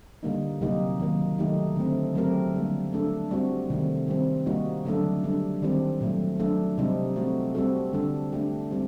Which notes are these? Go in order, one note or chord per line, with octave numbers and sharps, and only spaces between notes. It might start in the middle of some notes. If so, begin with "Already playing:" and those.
D3 G3 A#3 D#4
C3 F#3 A#3 D#4 G4
D#3 F#3 A#3
D#3 F#3 A3 D#4 G4
D3 A3 C4
F#3 A3 C4 G4 A#4
D3 G3 A#3
A3 D4 A4
G3 C4 F#4
C3 D#3 A3 C4
D#3 G3 C4
G3 A#3 D#4 F#4
D3 F#3 A3 D4 A4
G3 D4 A4
D#3 G3 C4 G4
A#2 F#3 A3
F#3 A3 D4 A4
C3 G3 C4 D#4 G4
A3 C4 F#4
G3 C4 F#4 A4
D3 G3 D4 A4
A3 D4 G4
G3 C4